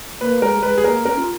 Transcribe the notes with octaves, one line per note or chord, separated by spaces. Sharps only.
A#3 B4
G#3 A#4
G#3 B4
G#4
A#3 A#4
C#4 A#4
F4